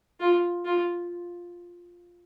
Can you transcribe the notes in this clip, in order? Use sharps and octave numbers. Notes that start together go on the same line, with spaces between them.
F4
F4